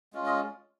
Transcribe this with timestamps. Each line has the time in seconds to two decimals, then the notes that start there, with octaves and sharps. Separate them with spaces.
0.13 G#3 C#4 F4
0.26 D#5